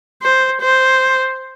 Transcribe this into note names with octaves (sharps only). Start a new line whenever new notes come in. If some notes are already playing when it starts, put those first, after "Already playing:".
C5
C5